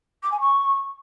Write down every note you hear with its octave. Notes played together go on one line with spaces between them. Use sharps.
D6
G#5
C#6